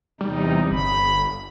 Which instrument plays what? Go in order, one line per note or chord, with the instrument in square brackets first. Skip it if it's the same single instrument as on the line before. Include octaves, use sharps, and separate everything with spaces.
[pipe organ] E2 C3 D#4 [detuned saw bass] G3
[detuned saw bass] G1 [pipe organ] B5